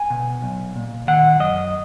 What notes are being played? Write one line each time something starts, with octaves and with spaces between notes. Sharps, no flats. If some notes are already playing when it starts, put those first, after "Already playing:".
Already playing: G#5
B2
B1
A#2
D#3 F#5
F#2 D#5